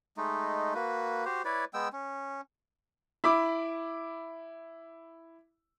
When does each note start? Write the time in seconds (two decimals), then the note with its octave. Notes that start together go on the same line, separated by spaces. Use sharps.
0.17 G#3 A3 D#4
0.75 A#3 F#4 B4
1.25 F#4 G4 C5
1.45 E4 B4 C#5 D5
1.74 G#3 B3 G5 E6
1.93 C#4
3.24 E4 B5 D6